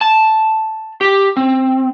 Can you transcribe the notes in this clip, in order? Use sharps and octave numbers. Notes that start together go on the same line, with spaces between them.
A5
G4
C4